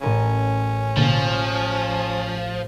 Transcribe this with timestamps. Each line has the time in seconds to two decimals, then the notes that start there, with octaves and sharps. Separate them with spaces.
0.01 A1 C#4 A#4 D#7
0.97 B2 D3 F3 A#3 A5